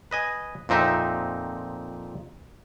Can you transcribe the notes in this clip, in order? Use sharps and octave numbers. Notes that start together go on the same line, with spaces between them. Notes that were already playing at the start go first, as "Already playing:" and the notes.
B4 D#5 G#5
F2 A#2 C4 D#4 E5